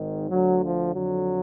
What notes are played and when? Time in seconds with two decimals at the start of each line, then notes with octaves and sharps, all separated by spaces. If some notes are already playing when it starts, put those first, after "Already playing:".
Already playing: G#1 G#2 D#3
0.30 D2 D3 F#3
0.62 F3
0.93 F2 D3 F#3